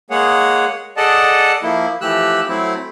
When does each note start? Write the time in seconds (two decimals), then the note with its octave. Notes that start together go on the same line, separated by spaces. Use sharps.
0.10 G#3 A#3 G#4 C#5 F#5
0.97 G#4 A4 D5 D#5 F#5 A5
1.63 F3 A#3 E4
2.01 E3 F3 A3 G4 E6 F#6
2.48 F#3 A3 C4 E4